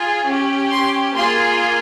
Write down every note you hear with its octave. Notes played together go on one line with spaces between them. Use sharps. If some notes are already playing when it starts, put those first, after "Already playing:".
Already playing: F4 G#4
C#4 G4
C6
A#3 F4 G#4 C6